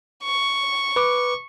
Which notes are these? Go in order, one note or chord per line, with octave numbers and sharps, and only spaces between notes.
C#6
B4 D6